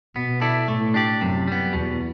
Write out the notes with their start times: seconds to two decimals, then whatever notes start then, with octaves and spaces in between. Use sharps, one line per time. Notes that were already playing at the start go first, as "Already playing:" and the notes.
0.15 B2 B3
0.41 E4 A4 D5
0.68 A2 A3
0.94 D4 G4 D5
1.21 F#2 C3
1.48 G3 B3
1.73 E2 B2